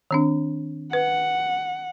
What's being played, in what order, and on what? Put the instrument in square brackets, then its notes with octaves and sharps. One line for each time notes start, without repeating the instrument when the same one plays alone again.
[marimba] D#3 C4 D4
[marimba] B4 [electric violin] F#5